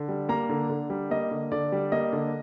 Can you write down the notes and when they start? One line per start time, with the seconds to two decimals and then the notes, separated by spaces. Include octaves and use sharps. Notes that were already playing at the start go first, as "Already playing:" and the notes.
Already playing: D3
0.09 G3
0.29 A#3 A#5
0.49 D3
0.70 D3
0.90 G3
1.11 A#3 D#5
1.31 D3
1.52 D3 D5
1.72 G3
1.92 A#3 D#5
2.13 D3